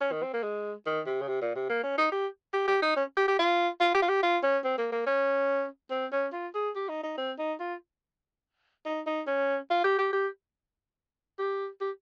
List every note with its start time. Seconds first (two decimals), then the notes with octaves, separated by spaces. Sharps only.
0.01 C#4
0.12 D#3
0.22 C4
0.34 A#3
0.43 G#3
0.86 D#3
1.06 C3
1.21 C#3
1.28 C3
1.42 A#2
1.56 C3
1.69 A#3
1.83 C#4
1.98 D#4
2.12 G4
2.53 G4
2.68 G4
2.82 D#4
2.96 C#4
3.17 G4
3.28 G4
3.39 F4
3.80 F4
3.95 G4
4.02 F4
4.09 G4
4.23 F4
4.43 C#4
4.65 C4
4.78 A#3
4.92 A#3
5.06 C#4
5.91 C4
6.12 C#4
6.33 F4
6.55 G#4
6.76 G4
6.89 D#4
7.03 D#4
7.18 C4
7.39 D#4
7.60 F4
8.86 D#4
9.07 D#4
9.27 C#4
9.70 F4
9.84 G4
9.99 G4
10.13 G4
11.39 G4
11.81 G4